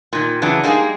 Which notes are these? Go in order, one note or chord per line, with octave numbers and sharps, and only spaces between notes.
A#2 D#3
C#3 E3 F#3 D4
G3 G#3 A#3 D#4 G#4